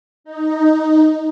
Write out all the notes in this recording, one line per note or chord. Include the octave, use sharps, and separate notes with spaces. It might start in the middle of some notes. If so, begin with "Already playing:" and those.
D#4